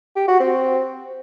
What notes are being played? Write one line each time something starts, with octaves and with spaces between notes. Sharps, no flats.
G4
F#4
C4